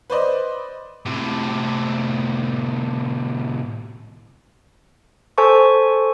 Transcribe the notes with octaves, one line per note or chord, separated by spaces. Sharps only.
B4 C5 D5 D#5
A2 C3
A4 C5 G#5 A5 C#6